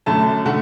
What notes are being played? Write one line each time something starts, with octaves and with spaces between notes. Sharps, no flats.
F#2 D3 A3 A5
D3 A3 F#5